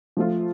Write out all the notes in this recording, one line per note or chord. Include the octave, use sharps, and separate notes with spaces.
F3 A3 F4